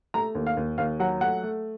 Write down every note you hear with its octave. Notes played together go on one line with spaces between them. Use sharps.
A3 A#5
D#2
F5
D#2
D#2 F5
F#3 F#5
A3 F#5
A3